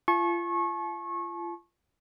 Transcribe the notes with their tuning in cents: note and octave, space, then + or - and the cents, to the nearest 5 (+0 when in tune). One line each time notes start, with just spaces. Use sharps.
F4 -30 A5 -40 C#6 -25